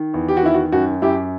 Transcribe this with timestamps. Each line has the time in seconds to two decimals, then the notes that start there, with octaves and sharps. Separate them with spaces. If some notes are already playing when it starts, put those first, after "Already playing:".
Already playing: D#3
0.14 E2
0.28 G4
0.37 F#4
0.43 D#3 E4
0.54 F#4
0.72 F#2 F#4
1.02 F#2 E4 G4